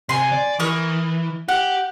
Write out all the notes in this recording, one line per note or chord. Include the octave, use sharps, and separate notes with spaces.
C3 G#5 C6
D5
E3 A#4 C#6 D#6
G4 F#5